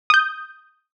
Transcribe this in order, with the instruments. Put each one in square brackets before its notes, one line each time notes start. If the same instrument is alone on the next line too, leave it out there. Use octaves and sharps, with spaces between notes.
[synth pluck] D#6 G6